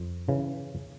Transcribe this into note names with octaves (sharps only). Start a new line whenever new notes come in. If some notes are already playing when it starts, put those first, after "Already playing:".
Already playing: F2
C#3 E3